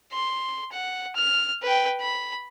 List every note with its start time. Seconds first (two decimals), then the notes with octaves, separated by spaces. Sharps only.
0.12 C6
0.72 F#5
1.16 F6
1.63 B4 G5
2.00 B5